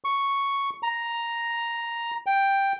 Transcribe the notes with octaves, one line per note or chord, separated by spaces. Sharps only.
C#6
A#5
G5